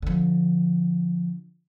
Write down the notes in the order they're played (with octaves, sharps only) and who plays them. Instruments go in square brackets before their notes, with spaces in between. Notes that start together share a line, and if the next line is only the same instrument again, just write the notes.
[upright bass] D3 F3